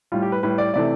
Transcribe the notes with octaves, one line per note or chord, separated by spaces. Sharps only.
A2 G3 F4
G4
B4
A2 G3 B4
D5
C3 E3 A3 D5